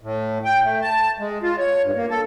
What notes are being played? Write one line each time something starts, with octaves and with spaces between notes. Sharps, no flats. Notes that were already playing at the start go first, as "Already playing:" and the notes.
A2
G5
A3
A5
G#3
F4
C#5
G2
A#3
A4